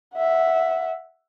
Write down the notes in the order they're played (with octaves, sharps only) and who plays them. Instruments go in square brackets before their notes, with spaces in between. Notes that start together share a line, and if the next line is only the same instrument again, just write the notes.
[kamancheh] E5 F#5